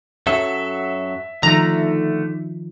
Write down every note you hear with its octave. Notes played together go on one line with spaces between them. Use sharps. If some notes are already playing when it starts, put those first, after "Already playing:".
F#2 F#3 A4 E5
D3 D#3 F3 A3 D#4 A#5